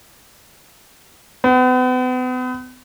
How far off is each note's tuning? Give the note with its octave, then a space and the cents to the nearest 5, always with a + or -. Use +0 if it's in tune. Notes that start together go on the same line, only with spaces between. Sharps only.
B3 +40